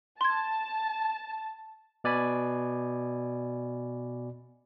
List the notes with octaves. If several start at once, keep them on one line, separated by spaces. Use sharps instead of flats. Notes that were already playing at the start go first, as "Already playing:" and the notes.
A5 C6 G#6
B2 D5 G#5 B5